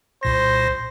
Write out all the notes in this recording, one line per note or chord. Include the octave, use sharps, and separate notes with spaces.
C2 A#2 C5 A#6